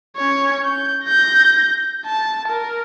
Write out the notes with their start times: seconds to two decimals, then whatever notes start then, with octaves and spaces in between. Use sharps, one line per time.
0.16 C#4 C#5
0.65 G6
1.05 G6 A#6
2.06 A5
2.48 A#4